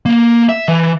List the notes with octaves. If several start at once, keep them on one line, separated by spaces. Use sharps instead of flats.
A#3
E5
E3